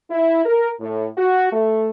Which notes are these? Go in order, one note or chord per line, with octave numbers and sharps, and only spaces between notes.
E4
A#4
A2
F#4
A3